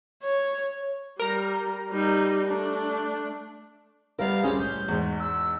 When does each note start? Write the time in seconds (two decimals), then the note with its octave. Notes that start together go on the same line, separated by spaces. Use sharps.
0.23 C#5
1.19 G3 A#4 A#5
1.92 G3 D#4
2.46 A3 D4
4.19 C3 G3 B3 A#4 F5
4.43 C2 C4 C#4 G4 G#4
4.60 A1 G6
4.88 E2 G#2 F#4
5.20 E6